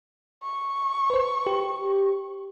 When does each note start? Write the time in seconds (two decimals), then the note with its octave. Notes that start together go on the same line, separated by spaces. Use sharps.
0.43 C#6
1.10 B4 C5
1.47 G4